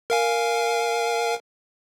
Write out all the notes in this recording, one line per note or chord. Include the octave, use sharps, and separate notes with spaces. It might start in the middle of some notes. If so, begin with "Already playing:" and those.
A#4 F5 G#5